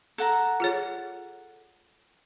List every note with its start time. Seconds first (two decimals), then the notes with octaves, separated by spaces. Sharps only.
0.18 A4 F#5 A#5
0.60 F4 G#4 C#5